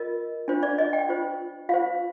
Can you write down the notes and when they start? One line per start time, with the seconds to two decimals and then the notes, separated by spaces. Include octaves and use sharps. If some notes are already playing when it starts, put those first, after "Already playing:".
Already playing: F4 A#4 D#5
0.48 D4 F4 C5
0.63 D5
0.78 D#5
0.93 G5
1.09 F4 C5
1.69 F4 C5 F5